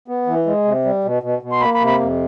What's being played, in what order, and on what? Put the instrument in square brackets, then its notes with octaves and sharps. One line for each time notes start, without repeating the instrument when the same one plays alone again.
[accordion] B3
E3
G#3
C3
G3
B2
B2
B2
C6
A#3 B5
B5
C3
B5
F2